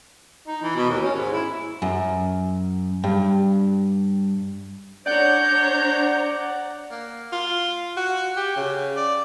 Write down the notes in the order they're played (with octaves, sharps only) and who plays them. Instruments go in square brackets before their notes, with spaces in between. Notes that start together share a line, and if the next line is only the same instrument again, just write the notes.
[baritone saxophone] D#4
E3
B2
D#2
C#4
G#2
E4
[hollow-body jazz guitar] F#2
G2
[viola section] D4 C#5 A#5 [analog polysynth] D5 F#5 [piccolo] G6
[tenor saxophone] A#3
F4
F#4
G4
C#3
D5